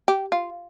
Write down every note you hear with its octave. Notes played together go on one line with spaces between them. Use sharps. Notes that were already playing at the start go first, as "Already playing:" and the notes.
G4
F4